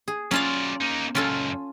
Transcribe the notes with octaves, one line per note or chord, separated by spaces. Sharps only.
G#4
F#3 C#4 F4 D5 F5
A#3 D#4
C#2 F#2 C#4 F4 A4